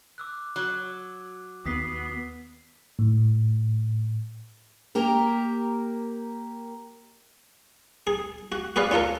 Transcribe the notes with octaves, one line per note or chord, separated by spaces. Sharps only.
D6 E6 F#6
F#3
D#2 B3 D#6 B6 C7
A2
A#3 G4 A#4
G#4
F#4
F#4 G#4 B4 D5 F5
C#4 F4 A4 A#4